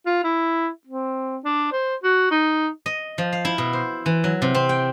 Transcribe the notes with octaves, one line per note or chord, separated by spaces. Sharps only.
F4
E4
C4
D4
C5
F#4
D#4
D#5
F3
F5
E4
B2
C5
E3
F#3
C3
C4
G5